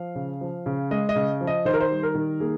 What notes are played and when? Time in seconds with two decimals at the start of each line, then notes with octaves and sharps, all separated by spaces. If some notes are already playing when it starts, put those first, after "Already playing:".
Already playing: F3 F5
0.15 C#3
0.41 F3
0.66 C#3
0.91 G#3 D#5
1.09 D#5
1.16 C#3
1.41 F3
1.47 D#5
1.65 D#3 C5
1.73 A#4
1.80 C5
1.91 G3
2.03 A#4
2.15 D#3
2.40 A#3 G#4